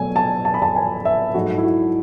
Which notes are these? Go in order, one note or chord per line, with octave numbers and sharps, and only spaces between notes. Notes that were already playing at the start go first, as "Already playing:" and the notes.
Already playing: B2 F#3 A3 G#5
A5
A5
B5
A5
G#5
E5
G#2 F#3 A3 F#4
E4
F#4